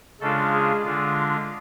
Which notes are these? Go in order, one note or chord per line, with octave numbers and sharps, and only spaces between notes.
C#3 G#3 D4 F4 A4
G#4
D3 G#3 D4 F4